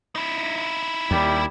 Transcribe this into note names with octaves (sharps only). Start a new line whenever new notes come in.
D#4 E4
D#2 G3